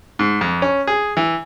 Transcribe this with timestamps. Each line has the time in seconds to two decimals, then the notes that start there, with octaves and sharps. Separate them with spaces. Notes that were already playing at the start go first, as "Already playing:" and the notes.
0.19 G#2
0.41 F2
0.62 C#4
0.87 G#4
1.17 E3